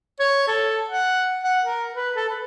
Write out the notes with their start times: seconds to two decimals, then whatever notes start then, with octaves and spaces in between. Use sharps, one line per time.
0.19 C#5
0.48 A4
0.89 F#5
1.43 F#5
1.64 A#4
1.94 B4
2.16 A4
2.29 B4